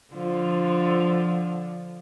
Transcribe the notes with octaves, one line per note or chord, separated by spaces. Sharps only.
D3 F3